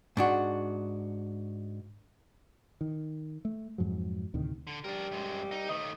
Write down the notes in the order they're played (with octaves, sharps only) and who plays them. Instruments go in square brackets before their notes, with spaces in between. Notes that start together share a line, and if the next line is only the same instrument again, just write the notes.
[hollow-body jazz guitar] G#2 D4 F#4
[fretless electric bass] D#3
A3
F2 G#2 F3 F#3
D2 A2 C3 D#3
[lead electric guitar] D3
[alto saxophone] G3 [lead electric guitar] D4 A#4
[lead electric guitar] F#2 G#3
D#4
[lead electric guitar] D#3 A3 [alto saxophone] D#5